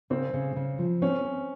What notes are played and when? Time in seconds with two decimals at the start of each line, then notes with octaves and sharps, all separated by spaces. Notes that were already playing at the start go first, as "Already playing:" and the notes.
0.10 C#3 C4
0.33 C#3
0.56 C#3
0.78 F3
1.02 C4 C#4
1.24 C4